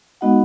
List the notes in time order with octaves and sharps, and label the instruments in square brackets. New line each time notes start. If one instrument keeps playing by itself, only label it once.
[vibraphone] G#3 B3 D#4 F#4 D#5 F#5